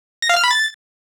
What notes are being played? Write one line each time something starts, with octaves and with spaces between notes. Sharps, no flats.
A#6
F5
F6
B5
A6